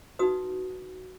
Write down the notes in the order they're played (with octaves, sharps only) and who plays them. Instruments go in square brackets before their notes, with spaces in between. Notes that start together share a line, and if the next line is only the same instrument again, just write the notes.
[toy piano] D#4 F#4 B4 D#6